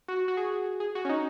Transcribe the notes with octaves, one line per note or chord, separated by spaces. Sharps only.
F#4
F#4
G#4
G#4
F#4
C#4
D#4